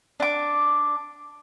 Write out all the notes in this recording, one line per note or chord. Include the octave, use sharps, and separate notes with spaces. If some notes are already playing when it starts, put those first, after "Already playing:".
D4 D6